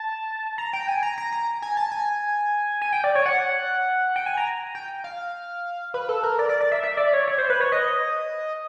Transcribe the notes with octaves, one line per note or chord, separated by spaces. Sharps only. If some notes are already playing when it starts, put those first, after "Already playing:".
Already playing: A5
A#5
G5
G#5
A#5
A#5
A#5
G#5
A5
G#5
G#5
G5
D5
C#5
F#5
G5
G#5
A#5
G5
F5
B4
A4
A#4
D5
D5
D5
E5
E5
D5
C#5
C#5
C5
B4
C#5
D#5